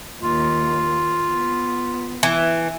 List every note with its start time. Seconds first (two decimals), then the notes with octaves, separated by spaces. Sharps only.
0.22 D#2 F4
1.29 B3
2.23 E3